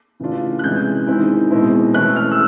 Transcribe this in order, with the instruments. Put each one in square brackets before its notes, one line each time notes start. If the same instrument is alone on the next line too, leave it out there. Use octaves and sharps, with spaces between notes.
[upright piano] C#3 E3 A3 D4 F4
F#6
C3 E3 G#3 C#4 E4 G6
D#3 G#3 C4 E4
B2 G#3 C4 E4
E3 A3 C#4 E4 F#6
F6
E6